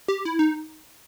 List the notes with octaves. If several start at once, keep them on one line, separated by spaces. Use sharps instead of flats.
G4
E4
D#4